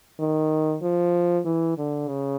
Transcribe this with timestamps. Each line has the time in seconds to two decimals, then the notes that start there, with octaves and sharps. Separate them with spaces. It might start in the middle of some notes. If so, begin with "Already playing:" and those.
0.19 D#3
0.82 F3
1.45 E3
1.78 D3
2.08 C#3